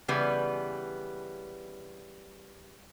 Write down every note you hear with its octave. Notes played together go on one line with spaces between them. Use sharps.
C#3 E3 G3 B3 B4